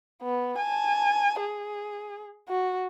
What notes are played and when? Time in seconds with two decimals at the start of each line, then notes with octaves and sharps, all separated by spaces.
0.22 B3
0.58 G#5 A5
1.41 G#4
2.49 F#4